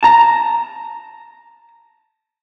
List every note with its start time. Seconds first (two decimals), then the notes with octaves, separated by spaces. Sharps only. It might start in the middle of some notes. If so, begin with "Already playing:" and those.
0.03 A5 A#5